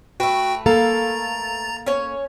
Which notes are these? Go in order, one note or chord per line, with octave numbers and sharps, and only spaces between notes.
A3 F#4 B4 G5
A#3 A4 F5 A#5 A6
C#4 C#5